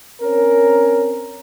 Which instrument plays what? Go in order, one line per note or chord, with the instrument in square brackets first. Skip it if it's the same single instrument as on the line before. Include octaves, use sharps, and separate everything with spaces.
[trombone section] C4 C#4 A#4